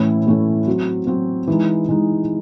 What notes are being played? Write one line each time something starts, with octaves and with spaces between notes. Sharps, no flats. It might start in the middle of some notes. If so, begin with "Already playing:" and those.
Already playing: A2 E3 A3 C#4 E4
A2 E3 A3 C#4 E4
F#3 C4 F#4
F#3 C4 F#4
E3 G#3 D#4
E3 G#3 D#4